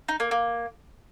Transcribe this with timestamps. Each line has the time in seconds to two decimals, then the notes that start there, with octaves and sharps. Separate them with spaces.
0.08 D#4
0.20 A#3
0.31 A#3